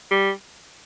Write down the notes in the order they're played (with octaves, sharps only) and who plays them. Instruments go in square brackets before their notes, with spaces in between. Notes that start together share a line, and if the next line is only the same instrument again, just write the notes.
[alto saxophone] G3